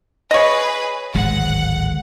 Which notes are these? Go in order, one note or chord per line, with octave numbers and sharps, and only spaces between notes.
G#4 B4 C#5 D#5
D1 G#1 G#3 F#5